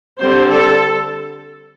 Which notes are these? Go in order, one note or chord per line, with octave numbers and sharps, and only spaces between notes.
D3 G3 C4 C5
A4